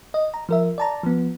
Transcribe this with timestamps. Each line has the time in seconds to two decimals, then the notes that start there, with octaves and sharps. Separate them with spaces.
0.14 D#5
0.34 A#5
0.49 F3 A#4 E5
0.78 D5 A5 A#5
1.03 F3 B3